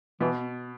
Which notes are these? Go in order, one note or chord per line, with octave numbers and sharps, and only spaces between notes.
B2 E3